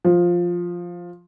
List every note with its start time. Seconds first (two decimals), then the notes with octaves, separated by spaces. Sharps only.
0.05 F3